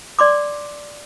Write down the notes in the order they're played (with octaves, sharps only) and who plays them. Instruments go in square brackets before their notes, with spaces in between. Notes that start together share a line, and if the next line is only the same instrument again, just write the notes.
[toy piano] D5 C6 D6